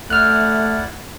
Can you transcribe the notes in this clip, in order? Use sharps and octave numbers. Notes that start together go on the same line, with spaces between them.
A3 E4 D5 F#5 F6 F#6